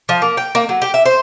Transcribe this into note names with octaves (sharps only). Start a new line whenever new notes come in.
F3
A#3
G5
A#3
F#3
G4
E5
C5